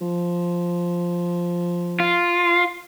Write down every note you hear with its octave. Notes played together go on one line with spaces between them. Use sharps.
F3
F4